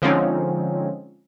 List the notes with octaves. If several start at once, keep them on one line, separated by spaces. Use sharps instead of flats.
D3 F3 G#3 C4 C#4 D#4